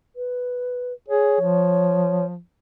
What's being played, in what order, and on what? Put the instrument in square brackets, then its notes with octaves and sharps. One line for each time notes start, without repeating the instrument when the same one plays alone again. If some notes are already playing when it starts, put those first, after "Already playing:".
[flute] B4
[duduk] G#4 [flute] C#5
[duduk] F3